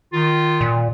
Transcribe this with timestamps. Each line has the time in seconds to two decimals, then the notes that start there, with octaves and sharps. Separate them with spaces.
0.13 D#3 F4
0.61 A#2